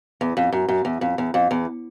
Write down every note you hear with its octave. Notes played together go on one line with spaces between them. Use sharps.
E2
F2
F#2
F#2
E2
F2
E2
F2
E2